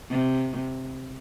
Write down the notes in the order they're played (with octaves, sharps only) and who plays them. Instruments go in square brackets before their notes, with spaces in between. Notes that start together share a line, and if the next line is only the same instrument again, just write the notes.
[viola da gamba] C3